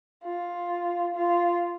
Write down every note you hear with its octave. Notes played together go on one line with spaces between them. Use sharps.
F4
F4